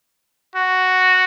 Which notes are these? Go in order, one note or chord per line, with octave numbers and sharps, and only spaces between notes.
F#4